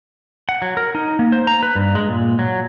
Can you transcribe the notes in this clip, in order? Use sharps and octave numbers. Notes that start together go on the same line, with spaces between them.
F#5
F#3
A#4
D#4
A#3
C5
A#5
B4
G2
G#3
A#2
F#3